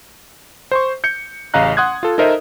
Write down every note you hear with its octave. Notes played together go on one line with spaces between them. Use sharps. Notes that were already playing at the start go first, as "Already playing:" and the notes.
C5 C6 C#6
G6 C#7
A1 C#3 D#5 F5 A#5 F#6
F#5 C6 D#6 F#6 G#6
F4 A4
D#4 A4 A#4 C5 D#5 E5